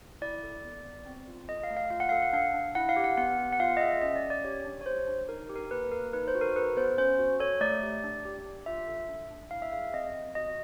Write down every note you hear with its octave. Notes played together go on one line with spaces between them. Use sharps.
E4 D5
A4
B3
B3
C4
F4
A4 D#5
F5
A3
F5
F4 F5
F#5
A4 F5
F#5
D4 F5
D4
E4 F#5
F5
G4
F#5
B3 F#5
B3
F#5
F4 F5
D#5
G#4 E5
C#4 D#5
D5
C#4
D5
G4 C#5
D4
C#5
G4 C5
D4
D#4 A#4
G4
A#4
A#3 B4
A#3 A#4
D#4 B4
C5
F#4
A#4
A4 B4
B3 C5
C#4 C5
F#4
A4 C#5
A3 D5
G4
D4
G4
D4
F4 E5
A4
D4
D4
E4 F5
E5
G#4 F5
C4 D#5
C4
F#4 D#5